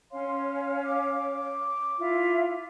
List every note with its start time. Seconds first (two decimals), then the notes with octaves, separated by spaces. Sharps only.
0.12 C#4 C#5 F5 C6
0.84 D6
1.99 E4 F4 E5